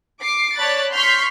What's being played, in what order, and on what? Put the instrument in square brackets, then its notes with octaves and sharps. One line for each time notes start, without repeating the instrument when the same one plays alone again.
[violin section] D6 C7
C#5 D5 A5 B5 F#6 A6
C6 C#6 F6 G6 B6 C7